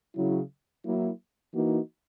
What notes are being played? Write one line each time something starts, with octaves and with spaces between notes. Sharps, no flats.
C#3 F#3 C#4 E4
F#3 A#3 E4
E3 A#3 D#4 F#4